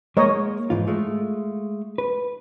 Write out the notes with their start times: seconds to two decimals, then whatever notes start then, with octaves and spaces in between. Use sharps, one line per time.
0.17 G#3 A#3 A#4 C#5 D#5
0.70 G#2 E3 F4
0.87 G#3 A3 F4
1.98 B4